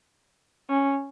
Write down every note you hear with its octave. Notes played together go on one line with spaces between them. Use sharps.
C#4